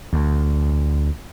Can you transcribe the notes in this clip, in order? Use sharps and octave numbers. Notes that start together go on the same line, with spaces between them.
D2